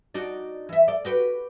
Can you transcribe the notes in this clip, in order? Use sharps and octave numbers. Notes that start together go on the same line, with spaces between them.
D4 D#4 F#4
E3 E5
A4 D5
F#4 G4 B4